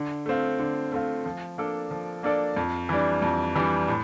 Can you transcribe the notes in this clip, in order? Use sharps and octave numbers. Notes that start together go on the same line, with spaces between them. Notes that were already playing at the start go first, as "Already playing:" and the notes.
Already playing: D3
A3 C4 F4
D3
A3 C4 F4
F3
A#3 D4 A4 D5
F3
A#3 D4 A4 D5
F2
E3 G3 D4
F2
E3 G3 D4
A2